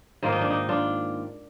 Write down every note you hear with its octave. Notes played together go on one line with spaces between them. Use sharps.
G#2 D#3 A#3 F4
D#4
D4
D#4
D4 F4